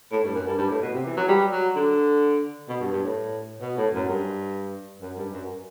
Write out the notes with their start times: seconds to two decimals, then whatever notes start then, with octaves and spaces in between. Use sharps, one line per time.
0.12 A2
0.24 G2
0.35 F#2
0.47 G2
0.59 G2
0.70 A2
0.82 B2
0.93 C3
1.06 E3
1.17 F#3
1.29 G3
1.52 F#3
1.75 D3
2.69 B2
2.80 G2
2.92 G2
3.04 A2
3.62 B2
3.77 A2
3.94 F#2
4.08 G2
5.02 F#2
5.18 G2
5.33 F#2